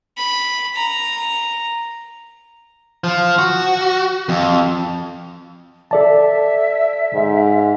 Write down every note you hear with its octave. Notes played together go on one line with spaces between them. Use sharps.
B5
A#5
F3
F#4
F2
A4 D5 E5 A5
G#2